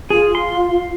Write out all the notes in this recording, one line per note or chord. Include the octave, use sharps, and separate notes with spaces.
F4 G#4
C6